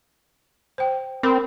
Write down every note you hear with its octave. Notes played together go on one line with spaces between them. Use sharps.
C5 G5
C4 A#4 B5 D6